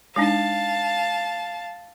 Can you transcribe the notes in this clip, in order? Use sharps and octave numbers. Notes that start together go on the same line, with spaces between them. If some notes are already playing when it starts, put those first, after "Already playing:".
G#3 D4 D#4 F5 A5